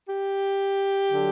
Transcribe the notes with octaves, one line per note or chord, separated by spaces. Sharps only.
G4
D3 F#3